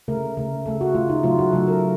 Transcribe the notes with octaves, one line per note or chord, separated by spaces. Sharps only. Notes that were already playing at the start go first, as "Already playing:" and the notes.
C#3 A3 A#4
C#3 A3
C#3 A3 A4
F#4
C#3 A3 F4
D#4
C#3 F#3 A3 F4
F#4
C#3 F#3 A3 A4
A#4